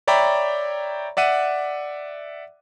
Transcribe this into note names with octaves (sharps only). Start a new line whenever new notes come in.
C#5 D5 E5 G5 A#5 B5
D5 E5 F#5 D#7